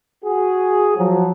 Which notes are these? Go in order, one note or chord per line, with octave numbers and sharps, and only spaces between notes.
F#4 G#4
F3 F#3